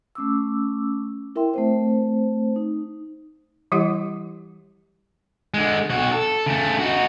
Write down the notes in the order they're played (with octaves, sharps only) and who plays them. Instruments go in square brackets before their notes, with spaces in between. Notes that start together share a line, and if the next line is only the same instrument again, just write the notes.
[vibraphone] A3 C#4 D6 E6
E4 A#4 E5 G5 C6
A3 C4 C5
D#4
[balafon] E3 G3 E4 G4 D#5 F#5
[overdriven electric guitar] D3 G#3
B1 F#4
A4
C#3 A3
D#4 F#4